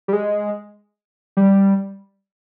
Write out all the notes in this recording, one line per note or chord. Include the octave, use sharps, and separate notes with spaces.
G3
G#3
G3